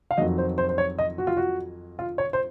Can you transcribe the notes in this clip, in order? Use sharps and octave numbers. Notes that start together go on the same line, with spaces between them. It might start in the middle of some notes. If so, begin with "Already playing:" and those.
F5
F2 D#3 F#3 D#5
C5
C5
C5
C#5
D#5
F#4
F4
F#4
F4
C#5
C5